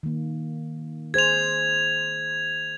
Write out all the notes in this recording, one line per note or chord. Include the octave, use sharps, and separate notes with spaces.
D#3 A#3
G#4 C5 G#6 F7